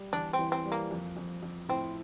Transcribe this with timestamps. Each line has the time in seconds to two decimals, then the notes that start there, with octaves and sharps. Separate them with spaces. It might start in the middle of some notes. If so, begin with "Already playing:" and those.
Already playing: G3
0.13 E2 D4
0.33 C4
0.39 E3
0.52 C4
0.65 G3
0.72 A#3
0.91 F2
1.17 F2
1.43 F2
1.69 A2 C4